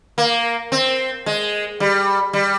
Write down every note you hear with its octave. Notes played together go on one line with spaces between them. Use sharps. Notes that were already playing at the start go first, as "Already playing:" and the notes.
A#3
C4
G#3
G3
G3